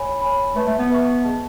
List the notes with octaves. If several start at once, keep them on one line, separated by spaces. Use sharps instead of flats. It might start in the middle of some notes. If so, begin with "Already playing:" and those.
Already playing: C#5 G#5 B5
C#5 G#5 B5
A3 B4 E5 A5 C#6
A3
B3
B4 E5 A5 C#6
G#4 D#5 A5